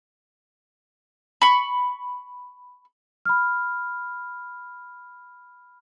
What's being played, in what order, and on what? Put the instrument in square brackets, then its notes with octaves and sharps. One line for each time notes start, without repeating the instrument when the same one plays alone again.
[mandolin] B5 C#6
[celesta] B5 F6